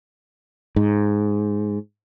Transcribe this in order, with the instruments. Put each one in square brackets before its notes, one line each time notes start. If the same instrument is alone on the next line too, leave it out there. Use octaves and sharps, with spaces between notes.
[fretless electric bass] G#2